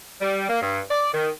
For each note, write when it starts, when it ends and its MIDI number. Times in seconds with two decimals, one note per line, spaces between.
0.22 0.47 55
0.49 0.62 58
0.62 0.80 43
0.91 1.14 74
1.14 1.30 51